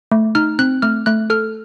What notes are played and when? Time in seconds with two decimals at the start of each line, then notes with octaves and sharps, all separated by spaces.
0.11 A3
0.35 D#4 F6
0.59 C4 F#6
0.82 A3 F6
1.06 A3 F#6
1.30 A4 F6